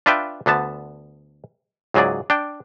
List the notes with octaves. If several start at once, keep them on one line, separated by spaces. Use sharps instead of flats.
D4 F4 B4 E5 G5
D2 D3 B3 A5
C#2 G#2 F#3 G#4 D5
D4 G5